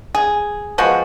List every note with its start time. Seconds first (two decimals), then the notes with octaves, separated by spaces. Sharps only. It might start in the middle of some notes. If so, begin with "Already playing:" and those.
0.15 G#4
0.78 F3 G#3 B3 F#4